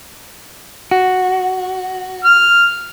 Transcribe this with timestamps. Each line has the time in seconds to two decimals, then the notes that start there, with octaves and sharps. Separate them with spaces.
0.91 F#4
2.24 F6